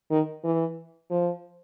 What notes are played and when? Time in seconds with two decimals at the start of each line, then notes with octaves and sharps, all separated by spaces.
0.11 D#3
0.44 E3
1.11 F3